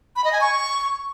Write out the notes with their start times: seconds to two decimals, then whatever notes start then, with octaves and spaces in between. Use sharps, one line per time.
0.16 B5
0.24 D#5
0.33 G#5
0.41 C#6